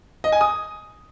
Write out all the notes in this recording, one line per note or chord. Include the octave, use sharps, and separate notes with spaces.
D#5
G#5
D#6